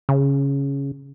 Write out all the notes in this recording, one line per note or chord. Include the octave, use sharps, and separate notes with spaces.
C#3